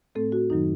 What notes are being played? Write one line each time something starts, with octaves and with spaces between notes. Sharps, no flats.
A2 A3 C4 A4
F#4
F#2 D#3 F#3 D#4